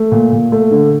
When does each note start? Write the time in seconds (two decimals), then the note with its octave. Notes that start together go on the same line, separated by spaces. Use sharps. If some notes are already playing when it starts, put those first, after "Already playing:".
Already playing: A3
0.12 A#2
0.32 A#2
0.52 A3
0.71 D3